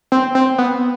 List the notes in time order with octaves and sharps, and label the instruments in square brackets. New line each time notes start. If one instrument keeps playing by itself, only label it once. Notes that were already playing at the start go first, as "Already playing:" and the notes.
[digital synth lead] C4
C4
B3